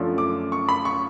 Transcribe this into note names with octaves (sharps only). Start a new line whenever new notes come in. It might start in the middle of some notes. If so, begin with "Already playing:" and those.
Already playing: F#2 D3 F3 A3 C#4
D6
C#6
B5
C#6